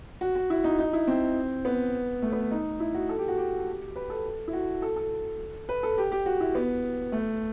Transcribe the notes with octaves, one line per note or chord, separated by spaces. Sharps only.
F#4
F#4
E4
D#4
D#4
E4
C4
B3
A3
B3
D#4
E4
F#4
A4
G4
F#4
G4
B4
A4
E4
F#4
A4
A4
B4
A4
G4
G4
F#4
E4
B3
A3